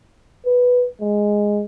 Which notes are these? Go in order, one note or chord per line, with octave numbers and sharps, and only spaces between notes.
B4
G#3